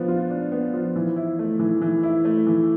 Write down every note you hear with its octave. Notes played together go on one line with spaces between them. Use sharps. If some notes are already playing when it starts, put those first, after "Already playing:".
Already playing: F3 B3 D4
F4
D4
B3
F3
E3
E4
A3
E3
E3
E4
A3
E3